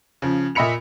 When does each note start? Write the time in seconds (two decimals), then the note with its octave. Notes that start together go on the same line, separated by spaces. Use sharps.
0.22 C#3 F3
0.55 A#2 D#5 E5 B5 C#7 F7